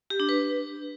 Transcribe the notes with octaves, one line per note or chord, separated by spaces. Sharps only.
G4
D4
B4